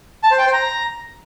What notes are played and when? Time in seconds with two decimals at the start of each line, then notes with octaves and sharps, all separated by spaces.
0.24 A5
0.31 C5
0.38 G5
0.46 C5
0.53 A#5